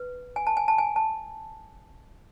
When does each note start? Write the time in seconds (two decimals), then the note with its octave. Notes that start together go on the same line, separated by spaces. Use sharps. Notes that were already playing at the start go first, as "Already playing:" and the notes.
Already playing: B4
0.36 G#5
0.47 A5
0.57 G#5
0.68 A5
0.78 G#5
0.96 A5